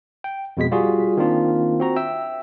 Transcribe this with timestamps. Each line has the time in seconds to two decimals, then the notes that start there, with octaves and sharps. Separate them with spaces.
0.24 G5
0.57 F2 B2 G#3 B6
0.71 G3 F4 F#4 G#4
1.17 D#3 A#3 C4 D4 F4
1.80 C4 F#4 A#5
1.96 E5 G5 E6